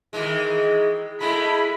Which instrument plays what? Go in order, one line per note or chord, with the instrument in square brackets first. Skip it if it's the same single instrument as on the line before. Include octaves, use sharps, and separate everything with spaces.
[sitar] D#3 E3 G#3
[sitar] G#3 A3 E4 [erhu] B5